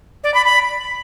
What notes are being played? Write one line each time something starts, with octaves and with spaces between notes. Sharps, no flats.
D5
B5
B5